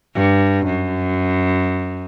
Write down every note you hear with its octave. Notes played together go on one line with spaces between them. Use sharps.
G2
F#2